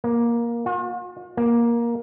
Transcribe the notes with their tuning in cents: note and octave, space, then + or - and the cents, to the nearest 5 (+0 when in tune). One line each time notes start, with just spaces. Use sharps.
A#3 +15
F4 +45
A#3 +15